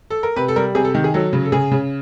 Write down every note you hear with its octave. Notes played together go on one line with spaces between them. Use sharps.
A4
A#4
C3 B4
A4
G3 A#4
C3 G#4
A4
D#3
G#4
F#3 A4
C#3
A4
C#3 G#4
C#3